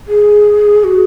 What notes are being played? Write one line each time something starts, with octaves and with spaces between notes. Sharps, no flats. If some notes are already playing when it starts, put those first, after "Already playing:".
G#4
F#4